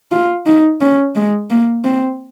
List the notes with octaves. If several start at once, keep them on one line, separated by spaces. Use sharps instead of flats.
F4
D#4
C#4
G#3
A#3
C4